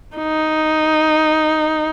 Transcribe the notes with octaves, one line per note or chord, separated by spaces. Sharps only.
D#4